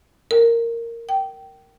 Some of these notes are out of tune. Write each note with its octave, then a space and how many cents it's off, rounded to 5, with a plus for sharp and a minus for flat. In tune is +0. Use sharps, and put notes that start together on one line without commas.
A#4 -10
G5 -20